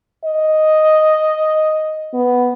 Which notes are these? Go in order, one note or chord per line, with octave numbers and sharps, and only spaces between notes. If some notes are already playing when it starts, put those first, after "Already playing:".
D#5
B3